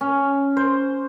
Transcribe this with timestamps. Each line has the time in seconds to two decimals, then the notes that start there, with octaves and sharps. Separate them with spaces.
0.01 C#4
0.57 C5